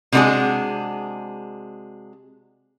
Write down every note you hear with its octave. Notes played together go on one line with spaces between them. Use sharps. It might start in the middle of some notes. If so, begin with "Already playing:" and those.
C3 G#3 B3 D4 F#4 G#4